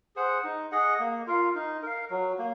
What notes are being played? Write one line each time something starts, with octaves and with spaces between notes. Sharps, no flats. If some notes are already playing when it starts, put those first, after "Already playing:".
G#4 C5 F#5
D#4
G#4 D#5 F#5
A#3
F4 A#4 F5
D#4
A#4 F5
F#3
A#3